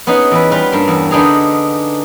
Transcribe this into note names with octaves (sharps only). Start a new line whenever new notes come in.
B3 C#4 D#4 G#4 B4
E2 E3 B4
G3 F4 B4
G2 A#3
E2
D3 B3 D4 D#4 G#4 A#5